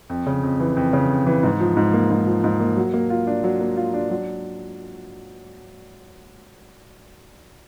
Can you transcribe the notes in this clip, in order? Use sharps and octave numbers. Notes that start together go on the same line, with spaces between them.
F2
C#3
F2
E3
F2
C#3
F2
E3
G#2
F3
G#2
A#3
G#2
F3
G#2
A#3
F#3
A#3
F4
D4
F#3
A#3
F4
D4
F#3